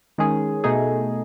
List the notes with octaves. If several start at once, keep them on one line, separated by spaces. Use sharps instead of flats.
D#3 G#3 C#4 G#4
B2 A3 D#4 G#4